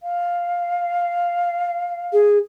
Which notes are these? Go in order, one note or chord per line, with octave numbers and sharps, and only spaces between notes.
F5
G#4